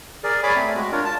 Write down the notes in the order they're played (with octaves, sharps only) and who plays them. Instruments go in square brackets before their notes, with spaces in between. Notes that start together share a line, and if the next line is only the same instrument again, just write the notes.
[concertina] G#4 A#4 D5
G#4 C#5 D5 G#5 B5 D6
A3 C4
G#3 F#4
D4 F4 A#4 C#5
A5